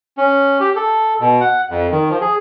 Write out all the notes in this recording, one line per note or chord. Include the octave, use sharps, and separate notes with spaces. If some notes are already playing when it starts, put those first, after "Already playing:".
C#4
G4
A4
B2
F#5
F2
D#3
F3
G#4